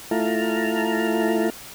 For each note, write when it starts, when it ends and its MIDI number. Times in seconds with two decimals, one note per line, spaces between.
0.11 1.50 57
0.11 1.50 64
0.11 1.50 65
0.11 1.50 81
0.11 1.50 82
0.11 1.50 89